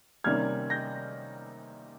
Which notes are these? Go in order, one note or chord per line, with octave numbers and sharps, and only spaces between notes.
C3 D#3 G3 A#3 C#4 F6 G#6
G6 A#6